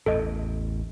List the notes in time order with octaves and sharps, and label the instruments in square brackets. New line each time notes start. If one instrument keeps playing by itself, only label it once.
[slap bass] A1 E2 [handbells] A4 D#5